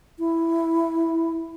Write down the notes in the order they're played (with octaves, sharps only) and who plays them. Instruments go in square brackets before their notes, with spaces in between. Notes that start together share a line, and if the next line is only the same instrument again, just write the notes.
[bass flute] E4